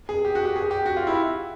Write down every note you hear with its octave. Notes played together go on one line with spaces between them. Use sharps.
G#4
G4
F#4
G4
G#4
G4
F#4
F4
E4